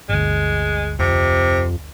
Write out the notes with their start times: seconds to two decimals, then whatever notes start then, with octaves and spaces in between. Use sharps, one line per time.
0.09 G1 D2 G#3
0.99 F2 C3